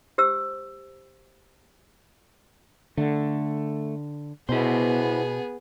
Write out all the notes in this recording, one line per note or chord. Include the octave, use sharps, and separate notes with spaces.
G4 C5 E6
D3 A3
B2 B3 E4 G#4 C5